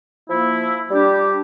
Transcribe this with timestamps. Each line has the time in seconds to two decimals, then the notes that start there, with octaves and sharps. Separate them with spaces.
0.29 F3 A#3 E4
0.91 G3 D4 G4